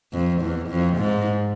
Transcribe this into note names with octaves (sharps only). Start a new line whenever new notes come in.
F2
E2
F2
G#2